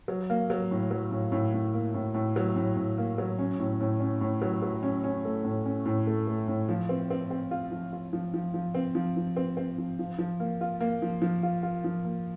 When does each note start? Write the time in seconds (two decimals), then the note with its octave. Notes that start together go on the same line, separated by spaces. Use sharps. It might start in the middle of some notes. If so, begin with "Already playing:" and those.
0.08 F#3
0.30 A#3
0.50 F#3
0.71 A2
0.91 F#3
1.11 A2
1.32 A2
1.54 A2
1.74 A#3
1.94 A2
2.14 A2
2.36 F#3
2.56 A2
2.77 A2
2.98 A#3
3.18 F#3
3.39 C#4
3.59 A2
3.80 A2
4.00 C#4
4.21 A2
4.42 F#3
4.62 F#3
4.83 C#4
5.04 C#4
5.25 A3
5.44 A2
5.65 C#4
5.85 A2
6.07 A3
6.27 A3
6.48 A2
6.69 F3
6.89 C4
7.10 C4
7.31 C4
7.51 F4
7.71 F3
7.93 F4
8.13 F3
8.34 F3
8.54 F3
8.75 C4
8.95 F3
9.17 F3
9.36 C4
9.57 C4
9.78 F3
9.99 F3
10.19 F3
10.40 A#3
10.61 F4
10.81 A#3
11.02 F3
11.22 F3
11.43 F4
11.63 F4
11.84 F3
12.05 A#3